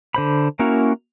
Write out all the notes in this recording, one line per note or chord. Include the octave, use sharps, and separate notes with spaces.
D3 C5 B5
A#3 C#4 E4 F#4 A#4